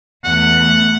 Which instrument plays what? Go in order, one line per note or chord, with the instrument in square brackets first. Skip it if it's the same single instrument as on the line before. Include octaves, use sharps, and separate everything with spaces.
[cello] E2 A3 [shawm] F#5